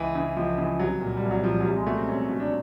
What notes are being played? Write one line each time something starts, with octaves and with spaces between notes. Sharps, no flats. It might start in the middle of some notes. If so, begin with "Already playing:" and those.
Already playing: C#2 E3
C#3 E3
C#2 F3
C#3 E3
C2 F#3
A#2
G3
C2
F#3
A#2 F3
F#3
C2 G3
G#3
B2 A3
C4
C2 C#4
B2
D4